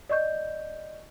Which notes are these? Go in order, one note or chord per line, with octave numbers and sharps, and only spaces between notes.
D5 D#5 C#6 G6